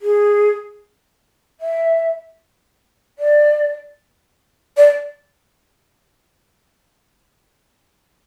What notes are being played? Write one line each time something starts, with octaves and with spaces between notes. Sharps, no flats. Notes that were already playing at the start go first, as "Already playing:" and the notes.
G#4
E5
D5
D5